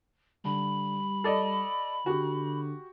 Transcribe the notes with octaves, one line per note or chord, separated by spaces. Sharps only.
D3 G3 B5
A4 D5 D#5
D3 F#4 G4